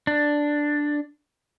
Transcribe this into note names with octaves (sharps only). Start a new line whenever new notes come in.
D4